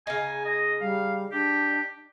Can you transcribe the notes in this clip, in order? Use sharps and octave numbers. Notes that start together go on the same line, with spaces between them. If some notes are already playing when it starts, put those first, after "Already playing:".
C#3 D#4 G#5
D#5
G3 F5
D4 G4